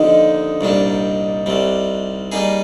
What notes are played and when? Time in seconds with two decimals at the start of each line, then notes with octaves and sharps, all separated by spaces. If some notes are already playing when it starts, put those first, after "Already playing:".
Already playing: D#2 D3 F3 D#4
0.61 C2 A#2 G3 D4
1.46 C2 C3 G3
2.32 G3 A#3 D#4 G#4